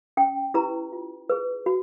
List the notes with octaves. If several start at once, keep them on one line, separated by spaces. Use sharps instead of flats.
C#4 G5
E4 G4 B4 A#5
F4
G#4 B4
F#4